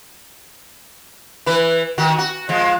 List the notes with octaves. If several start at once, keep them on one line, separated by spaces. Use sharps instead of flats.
E3 B4
D#3 F#4
F#4
F3 G#3